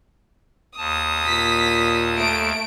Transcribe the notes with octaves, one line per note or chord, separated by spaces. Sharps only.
D#2 A5 D#6
A#2 B6
A3 D7